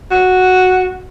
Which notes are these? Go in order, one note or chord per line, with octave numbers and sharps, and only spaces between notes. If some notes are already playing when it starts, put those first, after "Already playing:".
F#4